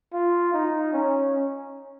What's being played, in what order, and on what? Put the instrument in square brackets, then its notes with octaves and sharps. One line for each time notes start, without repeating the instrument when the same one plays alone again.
[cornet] F4
D#4
C#4